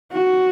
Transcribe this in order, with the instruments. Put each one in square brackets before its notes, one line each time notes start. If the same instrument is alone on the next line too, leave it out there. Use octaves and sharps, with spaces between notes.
[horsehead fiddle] F#4